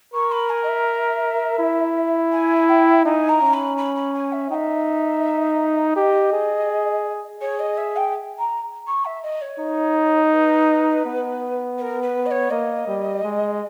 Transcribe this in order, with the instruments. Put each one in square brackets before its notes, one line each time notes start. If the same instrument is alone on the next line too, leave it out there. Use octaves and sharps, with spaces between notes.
[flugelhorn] A#4 [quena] C#6
[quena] B5
G#5
D#5
E5
[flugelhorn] E4
[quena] G#5
G5
[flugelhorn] D#4 [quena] G#5
[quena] A#5
[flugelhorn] C#4
[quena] B5
B5
B5
G#5
E5
[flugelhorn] D#4 [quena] E5 G5
[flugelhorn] G4 [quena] D#5
[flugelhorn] G#4
[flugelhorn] G#4 [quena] C#5
[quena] D#5
E5
G5
A#5
C#6
E5
D#5
C#5
[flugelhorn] D#4
[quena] B4
[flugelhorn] B3
[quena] B4
A#4
B4
D#5
C#5
[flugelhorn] A#3 [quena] D#5
[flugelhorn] G3
G#3